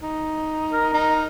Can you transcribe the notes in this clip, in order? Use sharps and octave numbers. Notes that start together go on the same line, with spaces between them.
D#4
A#4
D#4